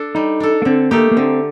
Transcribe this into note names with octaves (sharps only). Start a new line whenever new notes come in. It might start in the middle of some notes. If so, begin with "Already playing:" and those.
Already playing: D4 A4
G3 D#4
D4 A4
A#3
D3 C4
A3 A#3 D#4 G4
A#3
D3 C4